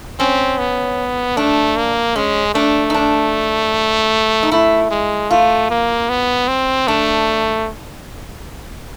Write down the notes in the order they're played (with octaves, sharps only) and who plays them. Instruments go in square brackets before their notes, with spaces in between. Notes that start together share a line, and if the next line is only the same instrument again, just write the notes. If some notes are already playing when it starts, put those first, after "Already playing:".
[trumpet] C4 [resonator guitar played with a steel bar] C#4
[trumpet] B3
[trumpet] A3 [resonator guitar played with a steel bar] D4
[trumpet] A#3
[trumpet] G#3 [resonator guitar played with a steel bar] C#4
[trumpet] A3 [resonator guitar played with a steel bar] D4
[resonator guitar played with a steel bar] D#4
D4
D#4
[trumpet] A3 [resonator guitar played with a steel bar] E4
[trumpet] G#3
[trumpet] A3 [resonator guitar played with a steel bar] F4
[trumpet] A#3
B3
C4
[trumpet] A3 [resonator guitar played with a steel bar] D4